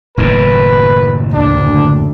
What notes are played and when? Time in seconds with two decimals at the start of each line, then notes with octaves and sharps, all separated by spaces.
0.17 F#1 A2 D#3 B4
1.33 D2 D4